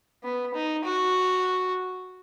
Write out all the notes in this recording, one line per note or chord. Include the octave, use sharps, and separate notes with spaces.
B3
D#4
F#4